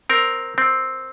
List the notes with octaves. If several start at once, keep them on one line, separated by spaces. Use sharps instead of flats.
C4 A#4
C4